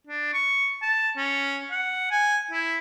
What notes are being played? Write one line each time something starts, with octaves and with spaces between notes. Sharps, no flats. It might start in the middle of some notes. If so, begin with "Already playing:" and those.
D4
C#6
A5
C#4
F#5
G#5
E4